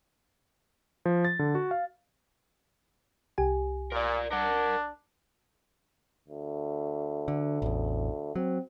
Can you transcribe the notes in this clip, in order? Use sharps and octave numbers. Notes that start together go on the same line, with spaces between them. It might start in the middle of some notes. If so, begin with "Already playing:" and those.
F3
A6
D3
F#4
F5
C2 G4 G#5
A#2 A#4 D5
D4 A#4 F#5
D2
D3
A1 E2
F#3 C4